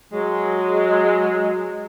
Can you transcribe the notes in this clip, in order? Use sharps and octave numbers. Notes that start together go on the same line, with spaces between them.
F#3 G#3